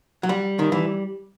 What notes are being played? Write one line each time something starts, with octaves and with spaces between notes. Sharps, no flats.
F#3
G3
D#3
E3